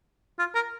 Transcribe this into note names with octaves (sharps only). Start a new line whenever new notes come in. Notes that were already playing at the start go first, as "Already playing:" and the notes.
F4
A#4